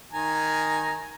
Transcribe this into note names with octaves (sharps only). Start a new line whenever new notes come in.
D#3 G#5 A#5